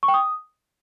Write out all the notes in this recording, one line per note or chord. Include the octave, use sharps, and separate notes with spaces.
C#6
G5
D#6